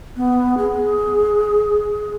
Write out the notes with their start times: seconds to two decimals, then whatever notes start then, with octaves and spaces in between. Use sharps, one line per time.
0.17 B3
0.58 G#4